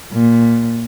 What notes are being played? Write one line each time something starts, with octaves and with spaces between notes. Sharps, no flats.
A#2